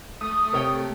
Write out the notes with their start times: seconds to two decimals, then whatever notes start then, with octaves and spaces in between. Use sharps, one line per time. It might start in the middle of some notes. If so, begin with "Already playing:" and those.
0.21 A3 D#6
0.53 C3 A#4 C#5 G5